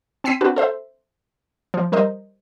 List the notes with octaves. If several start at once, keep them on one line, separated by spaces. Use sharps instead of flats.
C4 G#5 E6 B6 C7 D#7
C4 D4 F#4 B4
A4 C5 E5
F3
G3 A#4 C5 D#5